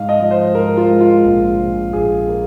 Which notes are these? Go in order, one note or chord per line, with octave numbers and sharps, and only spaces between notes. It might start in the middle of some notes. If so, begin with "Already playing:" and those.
Already playing: G#2 F5
D#5
F3
C5
G#2 A#4
F4
G#3
F4
A#1
A#2
A#1 G#4
A#3